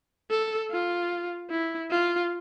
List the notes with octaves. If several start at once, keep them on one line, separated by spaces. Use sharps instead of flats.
A4
F4
E4
F4